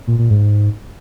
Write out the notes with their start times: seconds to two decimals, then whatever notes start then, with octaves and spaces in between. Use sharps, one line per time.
0.07 A#2
0.19 A#2
0.30 G#2